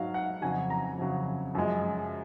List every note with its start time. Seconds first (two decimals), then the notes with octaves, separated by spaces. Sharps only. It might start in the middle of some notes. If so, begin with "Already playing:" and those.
Already playing: G#2 F#3 F5
0.14 F#5
0.42 F2 C#3 F#3 G#5
0.70 A#5
0.98 F2 C#3 F#3
1.55 F#2 F3 G#3